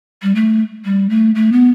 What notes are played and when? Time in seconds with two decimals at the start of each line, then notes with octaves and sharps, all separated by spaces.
0.23 G3
0.35 A3
0.85 G3
1.10 A3
1.35 A3
1.52 B3